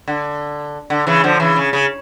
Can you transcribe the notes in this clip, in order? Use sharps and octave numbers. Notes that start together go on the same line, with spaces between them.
D3
D3
C#3 E3
D3 F3
C#3 E3
C#3
C#3